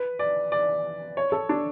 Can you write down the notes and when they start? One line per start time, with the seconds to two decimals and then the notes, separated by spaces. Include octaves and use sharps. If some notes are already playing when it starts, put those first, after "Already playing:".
Already playing: B4
0.19 D5
0.52 D5
1.17 C#5
1.32 A4
1.49 D4